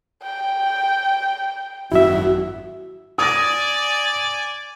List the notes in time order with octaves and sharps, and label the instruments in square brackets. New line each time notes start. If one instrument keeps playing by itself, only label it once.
[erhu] G5
[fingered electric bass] G#1 F#2 [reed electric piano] E4 E5 [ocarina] F#4
[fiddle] D5 G#5 [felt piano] D#6 A#6